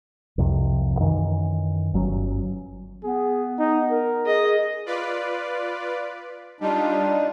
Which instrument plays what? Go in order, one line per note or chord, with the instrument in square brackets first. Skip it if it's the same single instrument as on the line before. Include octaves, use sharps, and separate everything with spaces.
[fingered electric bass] C2 F2 C3
F#2 D#3 E3
G1 F#3 C4 C#4
[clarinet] B3 [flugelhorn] G#4
[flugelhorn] D#4
A#4
[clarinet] G#4 [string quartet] D#5
[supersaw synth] F4 B4 D5
[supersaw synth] G3 F4 [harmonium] D4 D#4